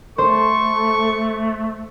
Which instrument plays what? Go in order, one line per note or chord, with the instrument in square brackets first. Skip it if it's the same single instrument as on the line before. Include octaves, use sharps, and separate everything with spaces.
[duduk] A3 [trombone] A4 [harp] C5 [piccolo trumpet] C#6